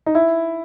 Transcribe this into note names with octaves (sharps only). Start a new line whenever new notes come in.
D#4
E4